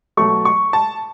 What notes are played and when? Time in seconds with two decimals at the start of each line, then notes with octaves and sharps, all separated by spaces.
0.17 B2 F#3 A3 C#6
0.45 C#6
0.73 A5